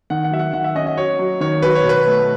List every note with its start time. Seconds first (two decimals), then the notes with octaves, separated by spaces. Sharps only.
0.10 D#3 F#5
0.24 F#5
0.31 F#3 E5
0.39 F#5
0.53 D#3 F#5
0.64 E5
0.76 C#4 D#5
0.87 D#5
0.97 F#3 C#5
1.19 F#3
1.41 D#3 C#5
1.62 F#3 B4
1.75 C#5
1.84 B2
1.89 B4
2.06 A3